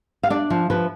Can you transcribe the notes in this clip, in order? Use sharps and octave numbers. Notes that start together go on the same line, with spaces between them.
F5
D4 D5
F3
F3 B4